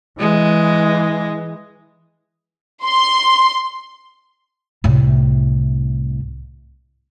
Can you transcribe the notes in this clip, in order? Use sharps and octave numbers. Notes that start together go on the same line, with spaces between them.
E3 G#3
C6
C2 A2